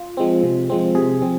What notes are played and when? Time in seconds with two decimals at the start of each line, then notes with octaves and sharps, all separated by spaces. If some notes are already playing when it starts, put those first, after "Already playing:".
Already playing: F4
0.17 F3 G#3 C4
0.43 C3
0.70 F3 G#3 C4
0.95 C3 G#4
1.22 F3 C4